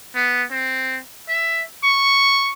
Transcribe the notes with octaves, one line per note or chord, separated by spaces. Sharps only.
B3
C4
E5
C#6